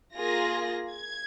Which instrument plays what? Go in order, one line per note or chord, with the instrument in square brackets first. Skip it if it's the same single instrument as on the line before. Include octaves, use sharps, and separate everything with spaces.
[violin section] A#3 F4 G#4 A#6
G#6